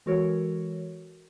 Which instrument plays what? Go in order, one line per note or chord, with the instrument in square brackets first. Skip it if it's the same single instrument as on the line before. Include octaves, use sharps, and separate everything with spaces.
[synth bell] E3 G#3 F#4 A4 A#4 C#5